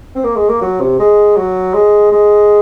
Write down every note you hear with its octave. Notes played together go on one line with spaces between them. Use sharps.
C4
A#3
G#3
A#3
F#3
C3
G#3
F#3
G#3
G#3